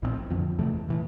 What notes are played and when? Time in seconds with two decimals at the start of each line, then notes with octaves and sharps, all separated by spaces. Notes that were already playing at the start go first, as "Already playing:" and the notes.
0.02 A#1 A2 F3 C4
0.30 F2 D3 F3 C4
0.59 E2 C3 E3 A3
0.89 A2 E3